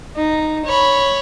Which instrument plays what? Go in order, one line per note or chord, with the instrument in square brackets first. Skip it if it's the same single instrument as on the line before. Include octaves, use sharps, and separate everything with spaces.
[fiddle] D#4
C#5 B5